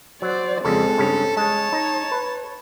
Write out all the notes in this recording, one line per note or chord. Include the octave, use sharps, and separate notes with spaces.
F#3 C5 D5
F2 C#3 G#3 C4 A4
G2 C#3 C#4
G#3 C#5 A5
D#4
B4